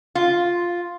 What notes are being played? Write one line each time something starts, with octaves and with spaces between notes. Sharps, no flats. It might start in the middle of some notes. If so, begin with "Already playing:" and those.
F4